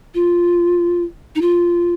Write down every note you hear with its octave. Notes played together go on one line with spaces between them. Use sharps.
F4
D#4
F4